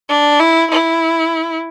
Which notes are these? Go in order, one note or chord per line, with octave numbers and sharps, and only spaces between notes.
D4
E4
E4